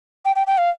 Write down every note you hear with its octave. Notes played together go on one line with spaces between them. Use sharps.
G5
G5
G5
F5